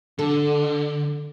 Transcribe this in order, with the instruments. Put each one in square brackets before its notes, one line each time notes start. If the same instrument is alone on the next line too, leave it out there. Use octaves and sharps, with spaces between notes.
[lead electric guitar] D3 [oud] A4